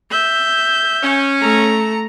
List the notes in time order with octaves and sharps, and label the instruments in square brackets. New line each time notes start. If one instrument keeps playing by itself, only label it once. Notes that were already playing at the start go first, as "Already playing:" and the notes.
[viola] E5 [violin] G6
[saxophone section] C#4
[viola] A3 [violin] A#5 C#7